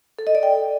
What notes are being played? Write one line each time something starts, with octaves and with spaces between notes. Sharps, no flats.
A4
D#5
D5
G5